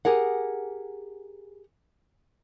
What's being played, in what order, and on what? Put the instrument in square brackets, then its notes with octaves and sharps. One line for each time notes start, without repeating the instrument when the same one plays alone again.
[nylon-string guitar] G4 G#4 A#4 F#5